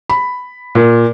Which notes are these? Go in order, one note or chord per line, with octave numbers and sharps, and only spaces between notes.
B5
A#2